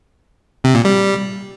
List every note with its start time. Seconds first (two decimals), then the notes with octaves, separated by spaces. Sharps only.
0.64 C3
0.75 A#2
0.85 G3